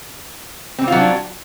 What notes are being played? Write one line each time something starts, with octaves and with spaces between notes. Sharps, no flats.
F#3 G3 C4 D4 F4